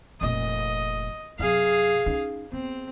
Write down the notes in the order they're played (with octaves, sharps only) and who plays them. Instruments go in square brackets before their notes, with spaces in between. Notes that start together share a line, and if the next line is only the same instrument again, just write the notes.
[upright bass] F1 A#2 [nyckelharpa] D#5
[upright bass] F#2 C3 [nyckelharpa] G#4 F5
[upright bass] C#4 D#4
[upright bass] B3 [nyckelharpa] C4